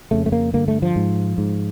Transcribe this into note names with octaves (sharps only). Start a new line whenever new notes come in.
F2 C#3 A3
A3
A#3
G2 D3 A#3
A3
F3
G#2
G#2